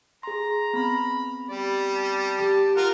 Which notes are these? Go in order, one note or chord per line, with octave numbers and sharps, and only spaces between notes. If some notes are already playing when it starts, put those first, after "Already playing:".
G#4 A#5 C6
B3 C4 B5
G3 D5
A5
G4
F4 A#4 F#5